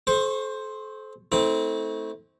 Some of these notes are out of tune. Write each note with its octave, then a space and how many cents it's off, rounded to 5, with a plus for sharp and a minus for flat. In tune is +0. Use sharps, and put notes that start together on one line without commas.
A4 -35 C5 +5 C#6 -30
A3 +0 C4 +0 E4 -45